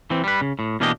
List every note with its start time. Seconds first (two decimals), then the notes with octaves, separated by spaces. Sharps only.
0.10 E3 C4
0.24 G3 B4
0.41 C#3
0.59 A2
0.80 B2 E3 A#3 D4 G4 D#5